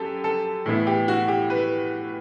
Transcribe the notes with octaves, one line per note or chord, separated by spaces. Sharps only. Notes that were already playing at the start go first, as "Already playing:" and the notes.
Already playing: F#2 G4 A4
A4
A2 E3 B3 E4
G4
F#4
G4
B4